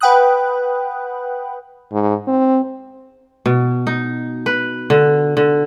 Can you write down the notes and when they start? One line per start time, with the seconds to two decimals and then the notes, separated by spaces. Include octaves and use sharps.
0.01 B4 F#5 G5 B5 D#6 F#6
1.92 G#2
2.27 C4
3.46 B2
3.87 D#4
4.46 B4
4.90 D3
5.37 D3